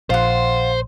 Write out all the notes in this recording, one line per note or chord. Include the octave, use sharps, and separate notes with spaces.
A#1 F4 C5 F#5